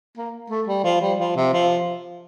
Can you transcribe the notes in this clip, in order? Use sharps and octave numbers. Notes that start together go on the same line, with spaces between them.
A#3
A3
G3
F3
G3
F3
C3
F3